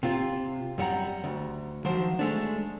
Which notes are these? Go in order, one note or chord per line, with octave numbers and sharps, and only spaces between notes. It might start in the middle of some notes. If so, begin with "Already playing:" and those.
C3 F4
F#2 G3 F#5 A#5
D2
D#3 F3 F#3 C5
G#3 A3 D4